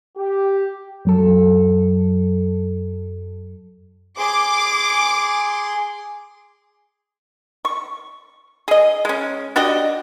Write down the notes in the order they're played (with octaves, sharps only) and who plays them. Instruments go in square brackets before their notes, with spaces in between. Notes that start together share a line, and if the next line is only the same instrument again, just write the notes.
[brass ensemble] G4
[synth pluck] F#2 F#3 A4
[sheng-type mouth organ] G#4 C6 [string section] D6
[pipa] C#6
G#4 D#5
G#3 C#4
D4 F#4 G4 D#5